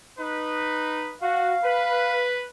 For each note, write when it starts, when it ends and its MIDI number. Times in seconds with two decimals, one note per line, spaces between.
0.19 1.12 63
0.19 1.12 71
1.22 1.54 66
1.22 2.24 77
1.64 2.45 71